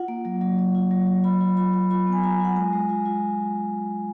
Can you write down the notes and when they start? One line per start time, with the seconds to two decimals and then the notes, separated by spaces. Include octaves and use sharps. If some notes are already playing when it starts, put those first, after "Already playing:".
Already playing: F4 F#5
0.08 A#3
0.25 F#3
0.41 F#3
0.59 F#3
0.75 F4
0.91 F#3
1.07 F#3
1.24 F4 B5
1.41 F4
1.57 F4 B5
1.73 F4
1.90 F4 B5
2.07 B3
2.12 G#5
2.23 F4 A#5
2.40 F4 F#5
2.56 G#3 G#5
2.73 G#3
2.89 F4
3.06 F4